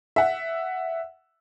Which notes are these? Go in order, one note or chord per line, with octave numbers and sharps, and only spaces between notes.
E5 F#5